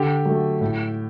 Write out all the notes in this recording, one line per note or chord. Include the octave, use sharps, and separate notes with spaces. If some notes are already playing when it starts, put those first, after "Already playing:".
Already playing: D3 G4
F#3 A3
A2